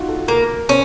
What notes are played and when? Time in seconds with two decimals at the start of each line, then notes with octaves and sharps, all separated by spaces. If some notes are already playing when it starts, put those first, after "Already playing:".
Already playing: D#4 F4 F#4
0.08 A4
0.28 A#3 A#4
0.69 C#4 C5